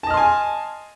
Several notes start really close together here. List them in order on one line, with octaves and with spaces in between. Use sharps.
A5 D#5 F6 C6 G#5